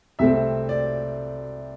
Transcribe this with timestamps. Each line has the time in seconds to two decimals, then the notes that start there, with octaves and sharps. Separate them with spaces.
0.19 C2 C3 A3 C4 E5
0.69 D5